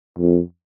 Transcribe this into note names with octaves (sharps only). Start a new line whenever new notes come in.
F2